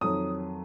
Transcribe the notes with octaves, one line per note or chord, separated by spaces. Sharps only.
F2 D#3 F#3 D#6